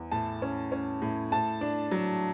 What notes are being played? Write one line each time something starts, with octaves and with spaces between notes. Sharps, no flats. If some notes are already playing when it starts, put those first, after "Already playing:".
Already playing: E2
A2 A5
C#4
C#4
A2
A2 A5
D4
F#3